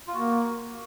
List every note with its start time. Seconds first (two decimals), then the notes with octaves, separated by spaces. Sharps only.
0.08 F4
0.14 A#3 F#4